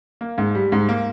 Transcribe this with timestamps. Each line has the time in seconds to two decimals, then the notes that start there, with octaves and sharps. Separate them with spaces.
0.21 A#3
0.38 G#2
0.55 G3
0.72 G#2
0.89 A#3